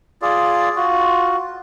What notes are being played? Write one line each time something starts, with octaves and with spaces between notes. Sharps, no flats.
F4 G#4 D5
F4 F#4